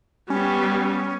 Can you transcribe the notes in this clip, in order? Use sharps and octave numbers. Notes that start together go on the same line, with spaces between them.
G3 B3 C#4